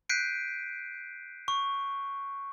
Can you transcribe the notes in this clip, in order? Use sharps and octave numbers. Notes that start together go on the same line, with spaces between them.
F#6 G6 B6 C7 D7 D#7
C#6